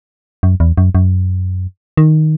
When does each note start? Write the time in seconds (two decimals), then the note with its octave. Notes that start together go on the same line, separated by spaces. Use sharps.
0.43 F#2
0.60 E2
0.78 F#2
0.95 F#2
1.97 D#3